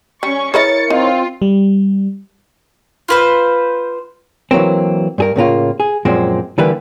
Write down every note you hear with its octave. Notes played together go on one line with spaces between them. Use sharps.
G3 C#4 C#6
E4 G#4 A#4 B4 C#5 D#5 A6 C#7
C4 D#4 F4
G3
F4 B4 C5
E3 F#3 A#3 C4
G2 G#4 A#4
A2 C#3 A#3 F4
G#4
F#2 A#2 F3 G#3 C4
D3 E3 G3 A#3 B4